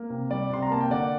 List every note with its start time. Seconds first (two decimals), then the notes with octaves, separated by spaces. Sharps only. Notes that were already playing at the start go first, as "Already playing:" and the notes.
Already playing: A#3
0.10 C3
0.30 G3 D5
0.50 C3 C6
0.63 A#5
0.71 A#3 A5
0.81 G5
0.91 D3 D5 F#5